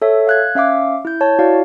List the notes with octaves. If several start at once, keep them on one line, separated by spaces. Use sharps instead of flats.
A4 C#5 E5
F5 F#6 G#6
C#4 E5 F5 D6
E4 G6
C#5 A5
E4 F#4 D5 F5